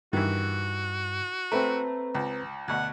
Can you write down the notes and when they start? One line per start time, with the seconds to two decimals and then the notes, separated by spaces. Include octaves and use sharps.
0.13 G2 D#3 E3 F#4
1.52 A3 C4 B4 A#5
2.15 C#2
2.68 D2 B2 F#5